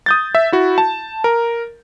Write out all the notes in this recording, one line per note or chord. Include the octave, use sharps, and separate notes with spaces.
D#6 G6 A6
E5
E4 F#4
A5
A#4